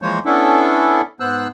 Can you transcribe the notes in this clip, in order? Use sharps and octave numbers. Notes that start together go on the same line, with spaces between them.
E3 F3 G#3 A#3 C5 C#5
B3 C#4 D4 E4 A4
G#2 B3 C5 E6 F#6